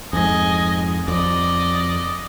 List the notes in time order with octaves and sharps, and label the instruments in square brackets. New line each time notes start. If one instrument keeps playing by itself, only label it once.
[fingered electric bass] F2 G#2 [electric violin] D#5 G#5
[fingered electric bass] F2 [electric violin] D5 D#5